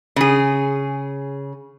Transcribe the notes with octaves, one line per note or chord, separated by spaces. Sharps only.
C#3 G#4